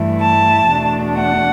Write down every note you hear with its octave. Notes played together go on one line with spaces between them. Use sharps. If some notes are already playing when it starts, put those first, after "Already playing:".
Already playing: G2 E3 A3 E4
A5
E2 B2 A3 D4
F#5